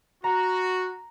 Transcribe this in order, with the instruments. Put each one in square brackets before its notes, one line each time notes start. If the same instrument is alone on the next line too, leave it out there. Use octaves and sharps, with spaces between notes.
[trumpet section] F#4 [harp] A#5